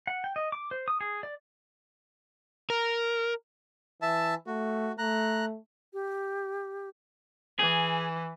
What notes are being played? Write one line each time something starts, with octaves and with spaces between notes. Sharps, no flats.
F#5
G5
D#5
D6
C5
D#6
G#4
D5
A#4
E3 E5 A5
A3 F#4
A3 A#5 F#6
G4
E3 G#4